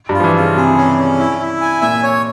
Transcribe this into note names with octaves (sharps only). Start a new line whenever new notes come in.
G2
F4
F3
E3
C#3 F4
C3 G#4
C#4
C#4
E4
E4
G#5
A#2 E5
C#5